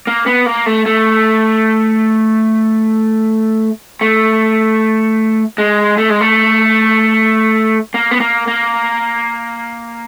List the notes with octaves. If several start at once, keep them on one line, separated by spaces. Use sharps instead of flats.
A#3
B3
A#3
A3
A3
A3
G#3
A3
G#3
A3
A#3
B3
A#3
A#3